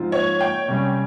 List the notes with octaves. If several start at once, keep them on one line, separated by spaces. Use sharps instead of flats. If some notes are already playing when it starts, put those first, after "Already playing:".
Already playing: G#2 F3 C4 F4
C#5
G5
C3 G3 C#4